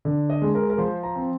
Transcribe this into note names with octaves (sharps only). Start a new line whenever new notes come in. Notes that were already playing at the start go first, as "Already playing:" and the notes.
D3
D#5
G#3
A#4
A#4
F3 C5
A#5
C4